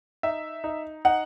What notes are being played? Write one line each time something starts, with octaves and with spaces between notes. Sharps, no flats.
D#4 E5
D#4
D#4 F#5